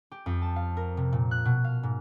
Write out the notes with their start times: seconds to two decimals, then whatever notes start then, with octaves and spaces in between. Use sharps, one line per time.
0.11 G4
0.26 F2
0.42 A5
0.56 F5
0.77 A#4
0.97 C3
1.13 A#2
1.31 F#6
1.45 B2
1.64 F5
1.83 G#2